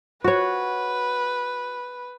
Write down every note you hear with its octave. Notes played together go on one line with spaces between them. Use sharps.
F#4 B4 C#5